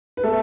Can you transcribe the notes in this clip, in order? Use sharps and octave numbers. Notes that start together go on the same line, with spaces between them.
B4
A3 B3 A4